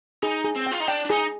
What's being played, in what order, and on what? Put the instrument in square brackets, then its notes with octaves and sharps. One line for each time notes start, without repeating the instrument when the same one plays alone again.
[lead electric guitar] D#4 [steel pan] G#4
[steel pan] G#4
[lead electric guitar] C4
[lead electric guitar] F4 [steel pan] G5
[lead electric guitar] D#4
[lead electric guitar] D4 [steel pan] G5
[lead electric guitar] D4
[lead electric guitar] D#4 [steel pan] G#4